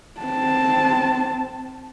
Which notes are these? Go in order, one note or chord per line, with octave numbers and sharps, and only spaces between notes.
C4 A5